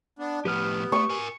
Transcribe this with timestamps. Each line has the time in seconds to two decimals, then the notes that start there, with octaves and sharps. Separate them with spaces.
0.19 B3 D4
0.45 A2 F3 B3 G4 B4 F6
0.92 A3 C#6
1.10 A#4 G#5